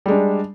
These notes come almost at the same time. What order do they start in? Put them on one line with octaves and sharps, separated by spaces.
G3 G#3 D4